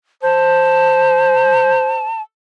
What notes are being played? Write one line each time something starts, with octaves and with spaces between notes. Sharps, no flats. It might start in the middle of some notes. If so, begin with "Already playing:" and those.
C5 A5